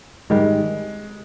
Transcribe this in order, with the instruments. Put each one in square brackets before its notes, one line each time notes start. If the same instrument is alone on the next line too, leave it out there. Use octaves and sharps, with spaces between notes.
[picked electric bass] G#2 D#3 G3 [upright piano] G#3